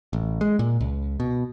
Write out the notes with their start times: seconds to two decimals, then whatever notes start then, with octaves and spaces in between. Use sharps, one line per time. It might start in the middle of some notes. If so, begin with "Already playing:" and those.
0.13 A1
0.41 G#3
0.59 A#2
0.80 C#2
1.20 B2